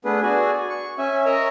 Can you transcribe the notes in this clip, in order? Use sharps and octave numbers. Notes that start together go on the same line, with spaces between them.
A3 B3 D4 G#4 B4
F#4 G#4 D5 G#5
C#6
C#4 E5 G#5
A#4 C#5 D#5 E5 A#5